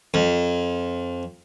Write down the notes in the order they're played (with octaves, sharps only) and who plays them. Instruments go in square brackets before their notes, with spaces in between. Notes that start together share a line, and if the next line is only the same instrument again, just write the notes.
[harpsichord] F2